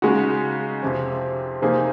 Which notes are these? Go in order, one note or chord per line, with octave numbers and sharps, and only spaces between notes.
C#3 G#3 D#4 F#4
F2 C3 F3
C3 F3 A#3 D#4 G#4